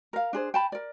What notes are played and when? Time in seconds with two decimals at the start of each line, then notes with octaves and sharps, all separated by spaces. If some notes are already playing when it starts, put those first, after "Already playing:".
0.13 A#4 F5
0.33 D4 G#4 C5
0.54 G5 A5 B5
0.72 A#4 D5